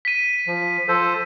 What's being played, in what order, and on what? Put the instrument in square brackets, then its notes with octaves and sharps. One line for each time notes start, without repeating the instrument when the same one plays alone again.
[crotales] B6 D#7
[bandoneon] F3
F3 A4 C5